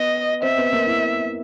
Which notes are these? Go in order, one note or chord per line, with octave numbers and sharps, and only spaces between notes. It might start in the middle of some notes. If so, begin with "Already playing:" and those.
Already playing: B3 B4 D#5
C4 C5 E5
B3 B4
A#3 A#4
E4